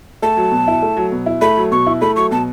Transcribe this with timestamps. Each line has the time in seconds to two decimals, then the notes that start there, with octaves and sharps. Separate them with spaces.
0.22 A3 A5
0.37 F#3
0.52 B2
0.68 E4
0.82 A3
0.97 F#3
1.12 B2
1.26 E4
1.41 A3 B5
1.57 F#3
1.72 B2 C#6
1.87 E4
2.01 A3 B5
2.16 F#3 C#6
2.31 B2 A5